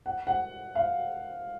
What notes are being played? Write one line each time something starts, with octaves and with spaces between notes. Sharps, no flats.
F#5
F#5
F5